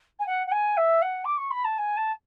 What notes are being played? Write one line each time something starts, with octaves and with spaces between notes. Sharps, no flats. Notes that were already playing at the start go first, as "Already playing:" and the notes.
G#5
F#5
F#5
G#5
E5
F#5
D6
C#6
B5
A5
G#5
A5